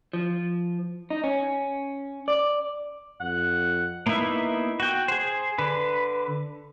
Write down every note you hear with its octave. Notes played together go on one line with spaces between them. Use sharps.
F3
D#4
C#4
D5
F2 F#5
A#3 B3 D#4 E4 E5
F#4 G5
G#4 C5
D3 B4